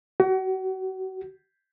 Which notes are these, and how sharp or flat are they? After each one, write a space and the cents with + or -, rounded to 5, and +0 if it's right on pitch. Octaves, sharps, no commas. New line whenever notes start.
F#4 +35